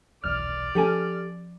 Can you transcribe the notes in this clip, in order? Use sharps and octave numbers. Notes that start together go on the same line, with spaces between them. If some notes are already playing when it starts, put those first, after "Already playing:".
D#1 B1 E2 D5 F6
F3 C#4 G4 A4 G#5